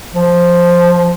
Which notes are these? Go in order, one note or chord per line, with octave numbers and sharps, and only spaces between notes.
F3